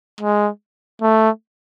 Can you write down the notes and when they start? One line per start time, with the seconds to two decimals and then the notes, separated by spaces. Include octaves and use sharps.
0.21 G#3
1.02 A3